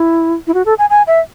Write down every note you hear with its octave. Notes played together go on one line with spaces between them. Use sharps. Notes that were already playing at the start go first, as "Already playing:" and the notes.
Already playing: E4
E4
F#4
A4
G#5
G#5
E5